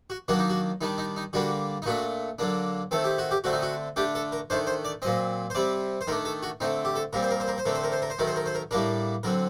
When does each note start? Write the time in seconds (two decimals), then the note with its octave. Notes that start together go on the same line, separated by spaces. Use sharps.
0.10 F#4
0.28 D#3 F#3 A#3 D4 F#4
0.39 D#4
0.49 F#4
0.81 D#3 G3 D4 D#4
0.98 D#4
1.16 D#4
1.33 D3 G3 A#3 D4 F#4
1.82 D#4
1.86 A#2 A3 D4 F#4
2.39 D3 F#3 A#3 D4
2.91 D#3 A3 C4 A4
3.04 G4
3.18 F#4
3.31 G4
3.44 D3 A3 C4 F#4
3.53 D#4
3.63 F#4
3.96 D3 A3 D4 G4
4.15 A4
4.32 A#4
4.50 D#3 A3 D4 C5
4.67 C5
4.85 D5
5.02 A#2 F#3 C4 D#5
5.50 C5
5.55 C3 G3 C4 D5
6.01 C5
6.07 D#3 A3 D4 A#4
6.25 A4
6.43 F#4
6.60 D3 A3 C4 D#4
6.85 G4
6.96 A4
7.13 A#2 G3 C4 A#4
7.23 C5
7.31 A#4
7.40 C5
7.48 A#4
7.58 C5
7.65 D3 A3 C4 A#4
7.75 C5
7.83 A#4
7.92 C5
8.02 A#4
8.10 C5
8.19 D#3 F#3 A3 A#4
8.27 C5
8.36 A#4
8.46 C5
8.55 A#4
8.71 A2 G3 A#3 D4 A#4
9.23 D3 F#3 C4 A#4